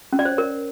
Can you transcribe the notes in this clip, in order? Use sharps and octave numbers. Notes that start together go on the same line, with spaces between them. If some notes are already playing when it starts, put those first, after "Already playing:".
C#4
D5
C5
C#5
A#4